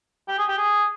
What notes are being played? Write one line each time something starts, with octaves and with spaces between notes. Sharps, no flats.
G4
G#4
G4
G#4